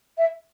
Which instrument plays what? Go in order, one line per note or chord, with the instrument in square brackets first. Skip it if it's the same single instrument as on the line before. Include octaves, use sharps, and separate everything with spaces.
[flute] E5